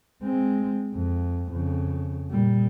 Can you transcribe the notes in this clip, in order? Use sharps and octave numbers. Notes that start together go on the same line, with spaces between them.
G#3 C4
F2
F2 C#3
A#2 G3